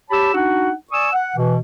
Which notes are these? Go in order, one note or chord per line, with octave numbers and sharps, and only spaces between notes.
G4 C#5 A5 B5 E6
D4 D#4 F#4 F#5
D5 G#5 C#6 D#6 E6
F#5
B2 E3